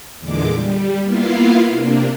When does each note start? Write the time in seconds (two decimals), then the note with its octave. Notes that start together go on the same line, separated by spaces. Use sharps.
0.20 E2 A#2 D3 G#3 D6
0.51 G3
1.03 A#3 B3 E4 F4 F5
1.69 C3 A#3 D4